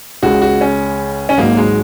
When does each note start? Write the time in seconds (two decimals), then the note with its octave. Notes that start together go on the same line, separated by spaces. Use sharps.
0.23 C#2 C#3 G#3 F#4
0.42 F#4
0.61 C#4
1.29 C#4
1.38 G#1 G#2 F#3 A#3 D#4
1.57 G#3